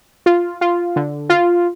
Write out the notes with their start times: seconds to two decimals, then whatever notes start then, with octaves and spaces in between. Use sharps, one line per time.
0.26 F4
0.61 F4
0.96 D3
1.29 F4